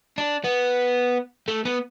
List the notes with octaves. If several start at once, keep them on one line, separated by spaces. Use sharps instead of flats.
D4
B3
A3
B3